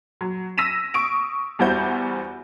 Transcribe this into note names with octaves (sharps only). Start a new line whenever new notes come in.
F#3
E6 A#6 B6 D#7 E7
C#6 D#6 D7
E2 G3 E4 F#4 C5 G6